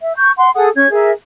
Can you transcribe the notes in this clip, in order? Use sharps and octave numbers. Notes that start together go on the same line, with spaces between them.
E5
C#6 G6
F#5 C6
G#4 A4 F#5 D#6
C#4 G#6
G#4 A#4 E5